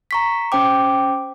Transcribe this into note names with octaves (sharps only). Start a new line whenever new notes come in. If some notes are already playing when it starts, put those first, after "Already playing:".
A#5 C#6 B6
C#4 C5 G5 D6